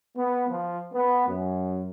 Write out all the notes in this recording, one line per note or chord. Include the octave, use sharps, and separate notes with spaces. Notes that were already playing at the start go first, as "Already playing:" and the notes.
B3
F3
B3
F#2